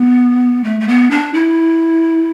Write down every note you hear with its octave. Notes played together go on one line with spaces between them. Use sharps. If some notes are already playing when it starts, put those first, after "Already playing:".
Already playing: B3
A3
A3
B3
D4
E4